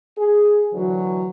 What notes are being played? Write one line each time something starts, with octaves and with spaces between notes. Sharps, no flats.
G#4
D2 D3 E3 F#3